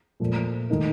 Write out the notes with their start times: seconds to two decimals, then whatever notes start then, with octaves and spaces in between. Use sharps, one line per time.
0.20 A#2 F3 A3
0.70 D#3 A3 D#4 A#4